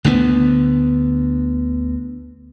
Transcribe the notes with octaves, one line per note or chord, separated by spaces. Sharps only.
D2 D3 F3 B3